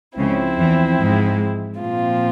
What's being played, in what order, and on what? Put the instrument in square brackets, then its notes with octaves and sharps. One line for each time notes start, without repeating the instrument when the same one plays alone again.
[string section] C#2 C#3 [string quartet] F3 C4 E4
[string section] E2 E3
G#2 G#3
[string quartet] A#2 F3 C4 F4